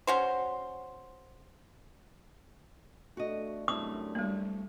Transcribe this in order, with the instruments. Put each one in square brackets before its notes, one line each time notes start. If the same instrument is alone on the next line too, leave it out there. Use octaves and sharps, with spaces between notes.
[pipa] C#4 F#4 C5
[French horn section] A3 D4 [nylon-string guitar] F#4 D#5
[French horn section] F#2 C3 D4 [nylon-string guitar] A3 C4 E4 [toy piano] D#6
[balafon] G3 A#3